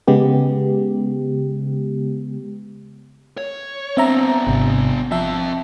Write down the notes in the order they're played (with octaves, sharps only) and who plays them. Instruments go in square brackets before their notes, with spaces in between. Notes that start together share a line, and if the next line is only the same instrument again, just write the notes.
[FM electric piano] C#3 G#3 B3 G4
[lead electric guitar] C#5
[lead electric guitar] B3 D4 [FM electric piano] C4 E5 A#5
[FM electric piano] G#1 C3
[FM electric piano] F3 E5 [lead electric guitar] C4 A5